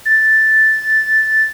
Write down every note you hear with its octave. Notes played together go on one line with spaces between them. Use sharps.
A6